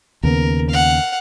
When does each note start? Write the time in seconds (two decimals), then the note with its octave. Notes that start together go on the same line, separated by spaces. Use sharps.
0.23 D#2 C#3 B3 A#4
0.70 F5 F#5